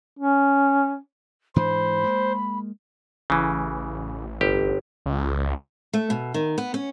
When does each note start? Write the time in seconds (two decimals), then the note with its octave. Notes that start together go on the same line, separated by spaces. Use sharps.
0.19 C#4
1.56 G#2 E3 D4 C5 B5
2.04 G#3 A#3
3.30 A1 C#3 E3
4.41 G1 G4
5.06 C#2
5.93 A3
6.10 B2
6.34 D#3
6.58 B3
6.74 C#4